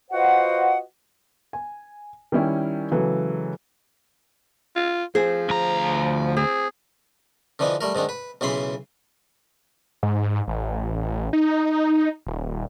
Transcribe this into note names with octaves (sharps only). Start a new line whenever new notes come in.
F4 F#4 B4 C5 D#5 F#5
G#5
D#3 G3 C#4 E4
C#3 E3 F#3 G#3 A4
F4
F3 C4 G#4
D2 A#5
C4 G#4
D3 E3 F3 D4 D#4
G3 A3 A#4
G#2 D#3 G#3 D4
B4
B1 C#3 E3 B5 C6
G#2
A1
D#4
D#1